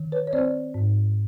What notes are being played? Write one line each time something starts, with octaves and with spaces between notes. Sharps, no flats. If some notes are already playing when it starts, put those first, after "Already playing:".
Already playing: D#3
B4 C#5
C#5
C4 C5 D5
G#2